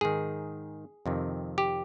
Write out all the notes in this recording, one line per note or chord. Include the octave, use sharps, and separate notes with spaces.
G#2 D#3 G#4
F2 C3 D#3
G4